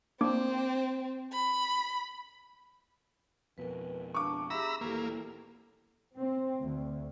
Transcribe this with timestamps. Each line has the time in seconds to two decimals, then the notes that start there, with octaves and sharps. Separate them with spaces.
0.21 A#3 C4 D4 D6
1.32 B5
3.58 F2 B2 A#4 B4
4.14 D4 F5 A5 C#6 D6
4.50 G4 G#4 E5 A#5 B5 E6
4.81 D#1 E3 A#3 G4 A4
6.16 C4
6.64 D2